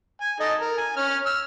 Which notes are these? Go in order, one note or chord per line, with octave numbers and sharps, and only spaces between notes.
G#5
D#4 A4 D#5
A#4
G#5
C#4 F6
E6 F6